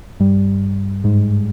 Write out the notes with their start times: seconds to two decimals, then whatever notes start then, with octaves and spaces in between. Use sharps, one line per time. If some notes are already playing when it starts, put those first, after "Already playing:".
0.20 G2 G3
1.04 G#2 G#3